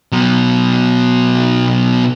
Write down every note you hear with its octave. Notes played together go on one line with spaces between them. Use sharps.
B2 F#3